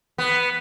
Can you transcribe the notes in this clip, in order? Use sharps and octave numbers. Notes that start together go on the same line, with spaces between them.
B3